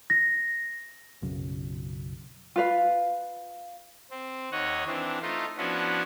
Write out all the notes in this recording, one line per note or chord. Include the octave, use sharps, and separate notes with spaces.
A#6
B1 F#2 C#3
F4 B4 F5
C4
D#2 C#5 D#5 F#5
E3 C4 D4
A3 D#4 F4
F3 B3 C#4 D4 E4 F#4